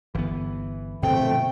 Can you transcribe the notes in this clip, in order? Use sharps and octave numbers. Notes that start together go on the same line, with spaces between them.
G1 E3 B3
A#1 G2 B2 D3 A3 C4 G5